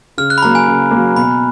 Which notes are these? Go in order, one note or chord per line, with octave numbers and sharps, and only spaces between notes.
C#3 F6
F#6
B5
F#3 A#3 A#5
G#5
C#3
F#3 A#3
B2 B5